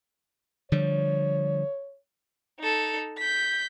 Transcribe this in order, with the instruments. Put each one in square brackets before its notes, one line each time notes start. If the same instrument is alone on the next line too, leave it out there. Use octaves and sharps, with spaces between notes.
[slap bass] D3 F3 G3 [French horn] C#5
[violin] D#4 A4
G6 B6